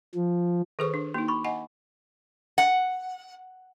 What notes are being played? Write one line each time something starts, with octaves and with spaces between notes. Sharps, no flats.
F3
D#3 G#4 A4 B4 C5 C#6
D4
A#3 D#4 F#4
B5 C#6 D6
D#5 F#5 G#5
F#5